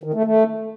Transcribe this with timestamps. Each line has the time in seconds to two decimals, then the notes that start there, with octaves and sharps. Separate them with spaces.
0.04 D#3
0.14 A3
0.24 A3